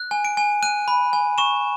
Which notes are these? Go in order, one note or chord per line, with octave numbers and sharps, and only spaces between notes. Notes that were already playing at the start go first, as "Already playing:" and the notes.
Already playing: F#6
G#5
D7
G#5
F#6 D#7
B5
G#5
C#6 E7